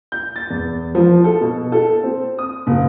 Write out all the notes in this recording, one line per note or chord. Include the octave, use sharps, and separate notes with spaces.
G6
A6
E2
F3
A4
B2
A4
C4
D#6
F#1